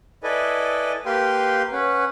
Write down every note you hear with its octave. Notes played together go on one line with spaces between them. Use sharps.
E4 A4 B4 D5 D#5 G#5
A#3 G4 B4 F5 G5 C6
C#4 B4 F#5